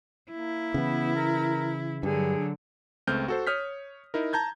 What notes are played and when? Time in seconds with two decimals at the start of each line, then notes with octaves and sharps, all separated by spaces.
0.31 A#3 E4
0.74 C#3 E3 B3
1.16 A#4
2.03 G2 D3 F#3 G#4
3.07 C#2 A3 C4 F6 G6
3.28 F#4 A4 C5
3.47 C#5 D#6 F6 G6 B6
4.14 D#4 E4 A#4
4.33 A5 A#5 G6 G#6